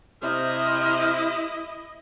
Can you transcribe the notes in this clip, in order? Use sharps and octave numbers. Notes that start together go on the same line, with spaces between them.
C3 E4 C5 D#5 F6